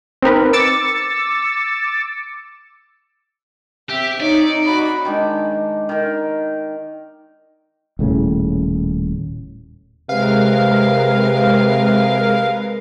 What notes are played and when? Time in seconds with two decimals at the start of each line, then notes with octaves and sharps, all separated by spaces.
0.22 C4 D#4 A#4 B4
0.53 D6 E6 A6 C#7
3.90 C4 G4 E5
4.20 D#4 C#5 D5
4.66 F#4 B5
5.05 D#3 G#3 D4
5.89 D#3 A#4
7.99 D#1 A2 C#3
10.09 C3 G#3 A#4 B4 F5